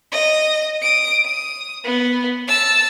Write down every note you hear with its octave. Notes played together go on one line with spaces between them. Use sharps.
D#5
D#6 D7
D#6
B3
A5 E6